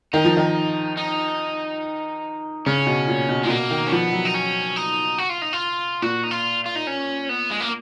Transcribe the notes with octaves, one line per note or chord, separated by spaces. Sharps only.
D#3 D#4
F3
D#3
D#4
C#3 C#4
B2
A#2
B2
A#2 G#3
B2 A#3
D#3
C#4
F3 B3
F#3
D#4
C#4
D#4
F#4
F4
D#4
F4
A#2 F#4
D#4
F4
F4
D#4
C#4
B3
G#3
A#3